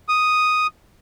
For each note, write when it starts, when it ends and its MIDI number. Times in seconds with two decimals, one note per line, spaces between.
0.09 0.67 87